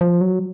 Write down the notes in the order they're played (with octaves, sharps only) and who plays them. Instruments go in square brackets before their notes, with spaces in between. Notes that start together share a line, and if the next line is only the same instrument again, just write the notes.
[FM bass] F3
F#3